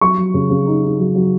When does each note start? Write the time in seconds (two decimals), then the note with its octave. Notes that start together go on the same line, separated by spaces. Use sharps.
0.01 F#3 C#6
0.17 F#3
0.34 C#3
0.50 C#3
0.67 D#4
0.83 D#4
0.99 F#3
1.15 F#3